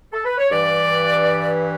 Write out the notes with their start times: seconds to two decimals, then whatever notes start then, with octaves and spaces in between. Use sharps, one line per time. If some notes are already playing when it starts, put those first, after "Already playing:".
0.13 A4
0.25 B4
0.38 C#5
0.50 G2 E3 D5